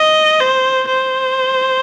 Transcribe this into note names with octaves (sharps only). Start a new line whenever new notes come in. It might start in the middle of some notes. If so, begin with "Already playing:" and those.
Already playing: D#5
C5
C5